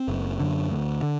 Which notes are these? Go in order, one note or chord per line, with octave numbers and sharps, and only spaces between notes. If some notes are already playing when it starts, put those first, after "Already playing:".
Already playing: C4
F#1
F#2 D3
D2
D3